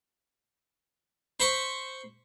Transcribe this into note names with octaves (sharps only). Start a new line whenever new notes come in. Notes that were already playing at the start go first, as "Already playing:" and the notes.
C5 B5 C#6